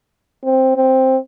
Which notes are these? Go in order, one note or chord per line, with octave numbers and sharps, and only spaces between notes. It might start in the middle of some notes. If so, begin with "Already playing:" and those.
C4
C4